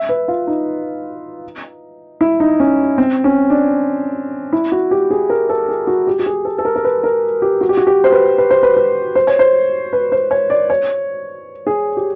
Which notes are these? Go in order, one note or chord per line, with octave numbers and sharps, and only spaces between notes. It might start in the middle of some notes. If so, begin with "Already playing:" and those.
Already playing: E5
B4
F4
D#4
E4
D#4
C#4
C4
C#4
D4
E4
F#4
G4
G#4
A#4
A4
G#4
F#4
G4
G4
G#4
A4
A4
A#4
A#4
B4
A#4
G4
F#4
G4
F#4
G4
C5
B4
B4
C5
B4
B4
C5
C#5
C5
B4
C5
C#5
D5
C#5
G#4
G4